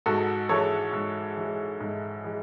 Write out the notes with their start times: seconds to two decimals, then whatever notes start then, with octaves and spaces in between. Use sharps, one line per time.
0.06 G#2 F#4 A4
0.49 E3 G#3 A4 C#5
0.93 G#2
1.37 E3 G#3
1.80 G#2
2.24 E3 G#3